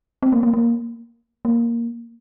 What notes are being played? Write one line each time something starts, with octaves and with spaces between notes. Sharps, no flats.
C4
A#3
A#3
A#3
A#3